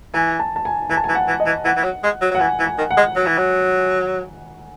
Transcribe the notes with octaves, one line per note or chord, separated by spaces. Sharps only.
E3 G#5
A5
A5
G#5
E3 G#5
A5
G#5
E3
F#5
E3
D#5
E3
E3 F#5
E3
F#3
G#3
F#3
F#3 F#5
E3 G#5
E3
G#5
D#3
F#5
G#3
F#3
E3
F#3